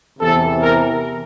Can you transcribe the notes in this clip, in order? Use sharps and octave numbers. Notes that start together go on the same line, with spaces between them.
E2 C3 E3 A4
A#4